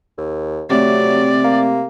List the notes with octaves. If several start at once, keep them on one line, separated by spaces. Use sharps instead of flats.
D#2
C3 F#3 A3 C4 G4 D5
A#3